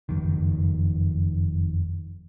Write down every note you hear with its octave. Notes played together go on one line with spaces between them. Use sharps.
F#1 F2 D#3